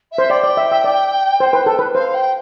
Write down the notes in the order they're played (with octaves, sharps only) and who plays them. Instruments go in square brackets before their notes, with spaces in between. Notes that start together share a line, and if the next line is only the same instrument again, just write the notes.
[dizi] E5
[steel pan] C5
[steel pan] D5 [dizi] G5
[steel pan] D5
E5
E5
D5
C5
B4
A4
B4
[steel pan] C5 [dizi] F5
[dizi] G5